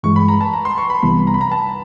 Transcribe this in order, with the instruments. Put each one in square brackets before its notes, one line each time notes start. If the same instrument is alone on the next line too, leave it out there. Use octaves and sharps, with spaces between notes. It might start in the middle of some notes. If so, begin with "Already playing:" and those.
[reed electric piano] G2 E3 G#3 [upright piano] C#6
[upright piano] B5
A#5
A5
A#5
C6
C#6
B5
[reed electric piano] C2 C3 E3 G3 B3 [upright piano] B5
[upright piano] A#5
B5
A#5
A5